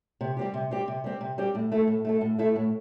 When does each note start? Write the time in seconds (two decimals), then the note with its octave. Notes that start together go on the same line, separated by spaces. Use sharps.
0.21 C3
0.37 G3 C4 G4
0.54 C3
0.71 G3 C4 G4
0.88 C3
1.04 G3 C4 G4
1.21 C3
1.38 G3 C4 G4
1.55 A2
1.72 A3 E4 A4
1.88 A2
2.05 A3 E4 A4
2.21 A2
2.38 A3 E4 A4
2.56 A2